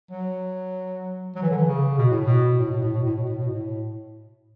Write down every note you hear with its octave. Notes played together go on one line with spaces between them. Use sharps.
F#3
F#3
E3
D3
E3
C#3
B2
A2
B2
A2
B2
A2
B2
A2
B2
A2
B2
A2